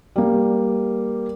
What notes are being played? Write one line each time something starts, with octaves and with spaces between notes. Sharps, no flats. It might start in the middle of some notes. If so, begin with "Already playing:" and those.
G3 A#3